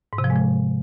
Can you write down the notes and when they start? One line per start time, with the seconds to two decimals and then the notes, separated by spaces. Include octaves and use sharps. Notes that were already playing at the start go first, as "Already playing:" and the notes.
0.13 G#2
0.18 C3
0.24 F3
0.30 G#3
0.36 F3